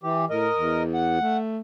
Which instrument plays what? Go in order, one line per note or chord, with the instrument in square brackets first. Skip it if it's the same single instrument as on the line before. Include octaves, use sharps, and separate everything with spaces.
[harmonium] E3 G4
[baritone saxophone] A2 [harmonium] A#4 D#5
[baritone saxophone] E2
[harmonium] F#5
[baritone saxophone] A3